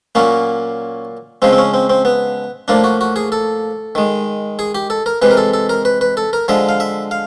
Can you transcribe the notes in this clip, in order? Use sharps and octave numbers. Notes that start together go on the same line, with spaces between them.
A#2 F#3 A#3 C#4
C#3 F3 G#3 C4
C4
C#4
C4
C4
B3
A2 F3 A#3 D4
F#4
F#4
G#4
A4
D#3 G#3
G#4
G4
A4
A#4
C3 E3 G#3 B4
A#4
A4
A4
A#4
B4
B4
A4
A#4
D3 F3 G#3 E5
F5
E5
F5